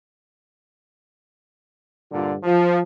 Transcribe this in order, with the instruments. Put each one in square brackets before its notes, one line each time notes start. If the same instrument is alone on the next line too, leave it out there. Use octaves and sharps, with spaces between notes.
[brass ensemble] G2 A#2 D3 F4
F3